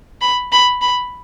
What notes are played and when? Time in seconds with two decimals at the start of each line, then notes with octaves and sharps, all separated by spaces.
0.22 B5
0.52 B5
0.81 B5